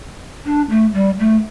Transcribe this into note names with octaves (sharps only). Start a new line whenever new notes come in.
D4
A3
G3
A3